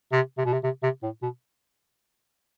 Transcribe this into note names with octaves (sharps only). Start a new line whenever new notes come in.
C3
C3
B2
C3
C3
C3
A2
B2